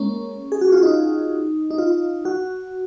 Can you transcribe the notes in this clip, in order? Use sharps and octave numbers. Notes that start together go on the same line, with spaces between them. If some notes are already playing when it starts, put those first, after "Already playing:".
Already playing: G#3 A#3 C#4
G#4
F#4
F4
D#4
D#4
F4
F#4